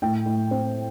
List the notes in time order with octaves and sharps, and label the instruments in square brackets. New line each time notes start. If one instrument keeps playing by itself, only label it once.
[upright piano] A2 G5
A2
C4